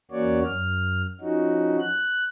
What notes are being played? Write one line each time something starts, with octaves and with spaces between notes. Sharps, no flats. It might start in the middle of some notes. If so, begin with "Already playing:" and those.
E2 A#3 C#4 F#4 C#5 D5
F#2 F6
F3 C#4 D#4 F#4
F#6